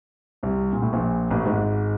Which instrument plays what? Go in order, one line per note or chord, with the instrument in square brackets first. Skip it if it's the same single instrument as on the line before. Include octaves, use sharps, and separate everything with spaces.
[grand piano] C2 C3
A#2
A2
A#1 A#2
A1 A2
G#1 G#2